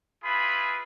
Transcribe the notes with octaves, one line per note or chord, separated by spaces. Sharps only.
E4 F4 G#4 B4 B5